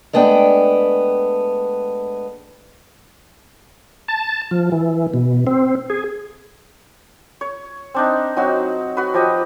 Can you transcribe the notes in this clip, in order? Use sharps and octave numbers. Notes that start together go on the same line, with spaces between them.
G#3 A3 B3 D4 G5
A5
F3
E3
B2
C4
G#4
C#5
C4 D4 D#4
F#3 C4 D#4 F#4
F#4 B4
F3 G4 D#5